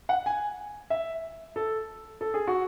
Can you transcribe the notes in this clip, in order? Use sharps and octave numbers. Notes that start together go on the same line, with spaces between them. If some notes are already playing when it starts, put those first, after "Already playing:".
F#5
G#5
E5
A4
A4
G#4
F#4